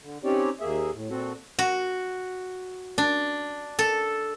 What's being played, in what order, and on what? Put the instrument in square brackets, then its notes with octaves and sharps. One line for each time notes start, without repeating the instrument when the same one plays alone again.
[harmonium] D3
C4 C#4 D#4 G4 C#5 D5
D#2 A#3 G#4 E5
A2
A#2 C4 F#4 A4
[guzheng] F#4
D4
A4